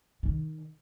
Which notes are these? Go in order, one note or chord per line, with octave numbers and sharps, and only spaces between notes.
D#3